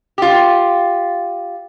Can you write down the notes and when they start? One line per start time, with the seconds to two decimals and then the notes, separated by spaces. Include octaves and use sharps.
0.18 F4 G4